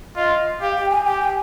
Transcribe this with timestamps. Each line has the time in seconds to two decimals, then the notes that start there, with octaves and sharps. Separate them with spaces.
0.16 F4 D#5
0.61 G4 F5
0.76 G5
0.91 G#5
1.06 G4 G5
1.21 G#5